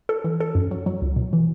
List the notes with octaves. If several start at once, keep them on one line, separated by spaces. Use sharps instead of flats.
A4
E3
A4
F#2
F#3
F#3
C#2
B2
E3